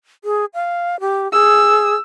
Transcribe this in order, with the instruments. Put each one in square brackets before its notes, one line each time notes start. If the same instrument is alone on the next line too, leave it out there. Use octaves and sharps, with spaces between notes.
[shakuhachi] G#4
F5
G4
[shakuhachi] G#4 [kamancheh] E6